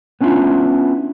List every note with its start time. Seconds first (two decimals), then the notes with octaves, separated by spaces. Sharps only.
0.21 B3 C#4 D4 E4 F4